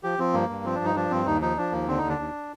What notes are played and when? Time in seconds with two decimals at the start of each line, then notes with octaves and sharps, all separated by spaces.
0.03 F3 G4
0.19 F3 C4
0.34 G2 A#3
0.49 G2
0.65 F3 C4
0.75 G2 D4
0.85 D#4
0.96 F3 D4
1.11 G2 C4
1.26 D#2 D#4
1.42 F3 D#4
1.57 F3 D4
1.72 D#2 A#3
1.88 D3 C4
1.98 D#4
2.03 D#2
2.09 D4
2.19 D#2